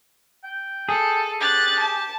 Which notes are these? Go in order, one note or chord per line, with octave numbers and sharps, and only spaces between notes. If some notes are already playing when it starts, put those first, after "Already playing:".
G5
G#4 A4
G4 F#6 A6
A5